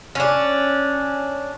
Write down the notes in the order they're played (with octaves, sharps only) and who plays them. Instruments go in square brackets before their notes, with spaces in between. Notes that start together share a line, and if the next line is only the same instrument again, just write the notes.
[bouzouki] C#4 D4